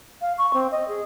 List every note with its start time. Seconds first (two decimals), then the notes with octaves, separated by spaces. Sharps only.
0.22 F5
0.38 C#6
0.54 C4
0.72 D#5
0.88 G#4